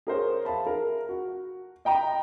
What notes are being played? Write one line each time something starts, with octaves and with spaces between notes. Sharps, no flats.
G#4 A#4 C5 C#5
E5 F5 A5 B5
A#4
F#4
D#5 G5 A#5 B5